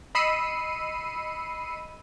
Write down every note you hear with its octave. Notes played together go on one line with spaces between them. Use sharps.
D#5 B5 E6 C7 C#7 D#7